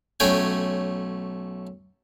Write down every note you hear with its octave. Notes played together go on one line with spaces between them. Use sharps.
B1 A3 C#4 G5 G#5